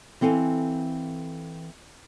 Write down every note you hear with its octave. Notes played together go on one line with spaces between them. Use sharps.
E3 C4 A4 F5 G#5